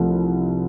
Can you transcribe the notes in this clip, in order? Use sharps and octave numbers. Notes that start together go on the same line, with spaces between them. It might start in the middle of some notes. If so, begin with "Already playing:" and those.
Already playing: C2 C3 F3 A3 C4